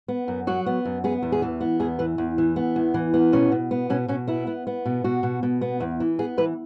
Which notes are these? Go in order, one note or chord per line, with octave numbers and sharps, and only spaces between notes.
B3
F#2
F#3 F#4
B3
F#2
B3 G#4
E2
G#4
E3
B3
E2 G#4
E3 B4
E2
E3
B3
E2
E3
B3
B2 C#4
B2
B3
B2 C#4
B2 C#4
B3 E4
B3
B3
B2
B2 F#4
B2
B2
B3
E2
E3
B3 G#4
E3 B4